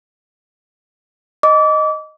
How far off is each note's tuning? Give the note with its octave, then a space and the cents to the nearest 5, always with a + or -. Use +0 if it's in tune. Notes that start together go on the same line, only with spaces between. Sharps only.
D#5 +0 D6 -30